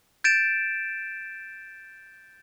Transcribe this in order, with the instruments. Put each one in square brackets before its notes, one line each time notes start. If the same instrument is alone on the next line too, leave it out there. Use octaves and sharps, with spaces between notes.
[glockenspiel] G6 A6 D7 E7